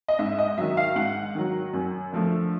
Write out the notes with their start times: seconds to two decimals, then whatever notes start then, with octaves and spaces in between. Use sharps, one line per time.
0.08 D#5
0.19 G#2 E5
0.39 D#5
0.58 D#3 F#3 E5
0.77 F5
0.96 G#2 F#5
1.35 D#3 F#3
1.73 F#2
2.13 D3 F3 A3